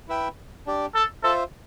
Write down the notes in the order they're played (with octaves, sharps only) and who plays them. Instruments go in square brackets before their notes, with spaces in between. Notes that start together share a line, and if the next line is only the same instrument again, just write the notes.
[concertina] E4 B4 E5 G5
D4 G4 D5
[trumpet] A4
[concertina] F4 C5 E5 [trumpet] A4